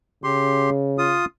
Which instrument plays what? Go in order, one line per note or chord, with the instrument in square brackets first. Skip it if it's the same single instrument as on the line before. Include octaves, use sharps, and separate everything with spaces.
[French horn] C#3 [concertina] G4 C6
[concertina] F4 D#6